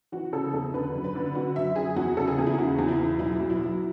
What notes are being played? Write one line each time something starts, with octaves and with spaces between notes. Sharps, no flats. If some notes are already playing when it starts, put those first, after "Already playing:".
E3 F#4
C#3 A4
E2 A4
D3 B4
F#2
B4
D3
D3 F#4
F#2 E5
F#2 G#4
E2 F#4
C#3 A4
G#4
E2
E4
C#3 F#4
E2
E4
E3
B1 E4
B1
E4
F#3